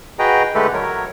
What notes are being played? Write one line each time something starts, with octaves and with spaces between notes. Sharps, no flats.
F#4 G#4 B4 D#5 G5 A#5
D3 G#3 A3 G4 A4 B4
F#3 A#4 C#5